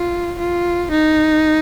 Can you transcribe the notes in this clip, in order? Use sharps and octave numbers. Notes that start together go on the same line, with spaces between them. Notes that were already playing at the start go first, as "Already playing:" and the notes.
Already playing: F4
F4
D#4